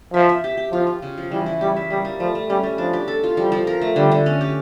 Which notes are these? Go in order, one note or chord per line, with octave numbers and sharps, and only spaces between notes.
F3 E5
E5
G4
G4
F3 F4
F4
C#3
F3
E3 G3
E4
G3 G4
E5
G3 A#3
G3
F3 A3
A3
G3 C#4
G3
F3 D4
G4
A4
F4
F3 G3
F3
A#4
A3
D3 G3
D3
C#4
G4